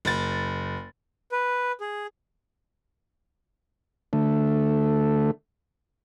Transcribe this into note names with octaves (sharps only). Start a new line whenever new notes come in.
F#1 A6
B4
G#4
D3 A3